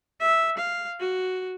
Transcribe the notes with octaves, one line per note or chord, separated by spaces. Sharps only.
E5
F5
F#4